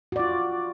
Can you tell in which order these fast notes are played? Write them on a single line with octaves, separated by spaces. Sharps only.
F#4 D5 F4